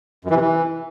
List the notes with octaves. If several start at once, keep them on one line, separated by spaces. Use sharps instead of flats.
F#2
E3
C3
E3